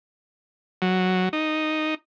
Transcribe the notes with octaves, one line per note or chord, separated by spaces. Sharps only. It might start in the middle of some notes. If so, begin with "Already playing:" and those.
F#3
D#4